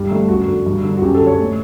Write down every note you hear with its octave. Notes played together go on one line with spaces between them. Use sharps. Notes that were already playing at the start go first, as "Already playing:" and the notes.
Already playing: G2 G3
D3 A3
F#2 F#4
D3
G2
D3
F#4
F#2 G4
A4
D3
C#5
A2